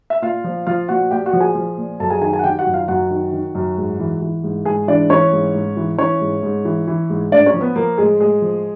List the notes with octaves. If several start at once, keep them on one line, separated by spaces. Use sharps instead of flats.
E5
A#2 F4 F5
F3
F3 F4 F5
A#2 F#4 F#5
A#2 G4 G5
F#4 F#5
F3
G#4 G#5
F3
A#2
F#2 A4 A5
G#4 G#5
D#3 G#4 G#5
G#4 G#5
F#5
D#3 G4 G5
F#4 F#5
F#2
F4 F5
F#2 F#4 F#5
D#3
D#3
F#2
G#2
E3
E3
G#2
G#2 G#4 G#5
E3 D4 D5
E3 C#4 C#5
G#2
G#2
E3
E3 C#4 C#5
G#2
G#2
E3
E3
G#2
A2 D4 D5
C#4 C#5
F3
B3 B4
F3 A#3 A#4
A2 G#3 G#4
A2 G#3 G#4
F3